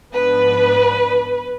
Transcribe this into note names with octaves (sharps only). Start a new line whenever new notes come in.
G#2 F3 B3 D4 B4